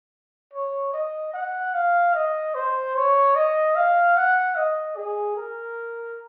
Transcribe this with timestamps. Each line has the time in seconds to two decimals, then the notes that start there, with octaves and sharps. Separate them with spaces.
0.54 C#5
0.93 D#5
1.34 F#5
1.74 F5
2.14 D#5
2.55 C5
2.95 C#5
3.36 D#5
3.76 F5
4.17 F#5
4.56 D#5
4.97 G#4
5.37 A#4